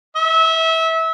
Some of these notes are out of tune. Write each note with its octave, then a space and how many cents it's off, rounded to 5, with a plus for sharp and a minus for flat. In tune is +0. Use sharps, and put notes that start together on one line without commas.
E5 -25